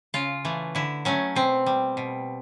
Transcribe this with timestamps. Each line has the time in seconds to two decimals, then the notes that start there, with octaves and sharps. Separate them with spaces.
0.14 C#3 F4
0.45 E3 A3
0.75 D3 E4
1.05 F#3 A3 C#4
1.35 B2 C4
1.66 G3
1.97 B2